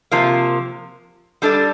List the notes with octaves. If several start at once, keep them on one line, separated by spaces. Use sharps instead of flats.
C3 F3 A#3
G3 D4 A4 D5